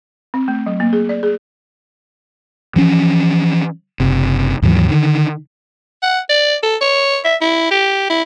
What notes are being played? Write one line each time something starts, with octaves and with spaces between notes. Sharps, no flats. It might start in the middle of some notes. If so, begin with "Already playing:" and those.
C4
A3
F#3
A#3
G#4
D5
G#4
E3 F3 C#4
F#1 C3
D#2 G#2 E3 F#3
D3 D#3
F#5
D5
A4
C#5
E5
E4
G4
E4